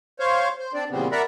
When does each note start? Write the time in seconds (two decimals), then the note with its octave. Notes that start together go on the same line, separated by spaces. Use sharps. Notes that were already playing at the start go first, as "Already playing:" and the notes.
0.20 C5 C#5 F5
0.59 C5
0.74 C4 D4 D5
0.90 E2 A#2 C#3 G3 B3 C4
1.12 A#4 D5 E5 F#5 A#5 B5